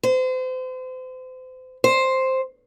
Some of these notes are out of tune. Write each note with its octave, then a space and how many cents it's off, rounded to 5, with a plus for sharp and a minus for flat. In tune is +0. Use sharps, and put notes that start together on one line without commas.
C5 -35
C5 +5